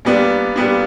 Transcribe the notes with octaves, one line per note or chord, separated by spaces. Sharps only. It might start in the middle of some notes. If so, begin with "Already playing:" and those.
A#2 G3 B3 D4
A#2 G3 B3 D4